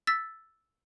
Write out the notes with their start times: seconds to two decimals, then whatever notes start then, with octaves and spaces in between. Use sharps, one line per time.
0.07 E6 A6 B6